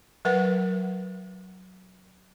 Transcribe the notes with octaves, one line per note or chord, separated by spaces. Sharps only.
F#3 A#4 B4 F#5